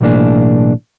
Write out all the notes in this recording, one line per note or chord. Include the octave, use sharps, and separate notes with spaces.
B1 A2 E3 A#3 D4 G#4